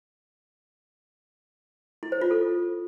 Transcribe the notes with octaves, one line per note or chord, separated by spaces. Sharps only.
E4
C5
F4
A4